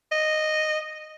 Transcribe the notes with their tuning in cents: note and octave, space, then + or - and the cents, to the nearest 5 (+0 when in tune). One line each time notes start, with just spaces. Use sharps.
D#5 -10